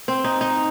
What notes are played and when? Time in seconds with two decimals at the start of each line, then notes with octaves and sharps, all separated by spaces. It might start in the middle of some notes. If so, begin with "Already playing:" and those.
0.08 C4
0.24 D#4
0.41 D#4